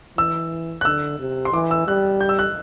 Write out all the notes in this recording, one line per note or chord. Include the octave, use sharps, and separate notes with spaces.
E3 E6
F#6
D3 E6
C3
C6
E3 D6
E6
G3 F#6
G6
E6
F#6